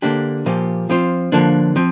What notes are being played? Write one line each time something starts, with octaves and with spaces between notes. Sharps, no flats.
D3 A#3 D4 G4 C5
A#2 F3 A#3 G4
F3 C4 F4 C5
D3 F3 A#3 D4
F3 C4